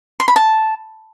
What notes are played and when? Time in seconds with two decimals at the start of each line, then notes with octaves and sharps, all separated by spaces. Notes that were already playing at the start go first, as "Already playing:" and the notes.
0.20 C6
0.28 B5
0.36 A5